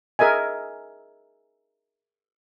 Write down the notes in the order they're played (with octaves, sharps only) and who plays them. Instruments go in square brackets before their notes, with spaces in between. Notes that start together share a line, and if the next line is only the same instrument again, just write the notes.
[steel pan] G#4 A#4 D#5 E5 G#5